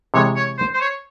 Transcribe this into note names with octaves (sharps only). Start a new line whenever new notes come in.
C3 E3 G#3 C#5
C#5
C5
C5
C#5